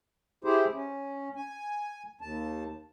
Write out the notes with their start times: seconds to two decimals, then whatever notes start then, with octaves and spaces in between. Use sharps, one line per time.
0.44 E4 G4 G#4 C5
0.73 C#4
1.36 G#5
2.21 D#2 A5